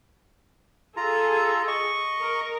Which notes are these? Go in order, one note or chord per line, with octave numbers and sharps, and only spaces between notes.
F4 G#4 A4 A#5
D#5 C#6
A#4